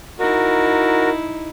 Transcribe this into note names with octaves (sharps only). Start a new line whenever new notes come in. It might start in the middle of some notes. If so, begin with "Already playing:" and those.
D#4 E4 F#4 A#4